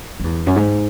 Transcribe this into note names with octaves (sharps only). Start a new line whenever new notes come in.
F#2
E2
F#2
G#2